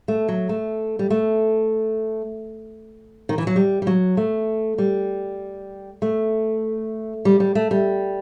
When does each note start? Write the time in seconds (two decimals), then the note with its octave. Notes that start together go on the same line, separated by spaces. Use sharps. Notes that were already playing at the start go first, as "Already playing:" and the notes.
0.08 A3
0.28 F#3
0.49 A3
0.99 G3
1.10 A3
3.29 D#3
3.38 E3
3.47 F#3
3.56 G3
3.82 G3
3.87 F#3
4.17 A3
4.78 G3
6.02 A3
7.25 G3
7.40 G3
7.55 A3
7.71 G3